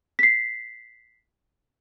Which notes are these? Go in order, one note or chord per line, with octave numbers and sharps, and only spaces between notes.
B6 C7